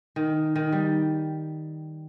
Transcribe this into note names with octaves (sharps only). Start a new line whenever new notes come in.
D#3
D#3
G3